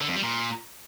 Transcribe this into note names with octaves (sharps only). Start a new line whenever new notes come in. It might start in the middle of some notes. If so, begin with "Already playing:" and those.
D3
F2
G3
A#2